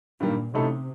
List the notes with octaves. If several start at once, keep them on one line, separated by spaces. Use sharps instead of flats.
G2 A#2 D#3 G3 A#3
A1 A2 C3 A3 D#4 A4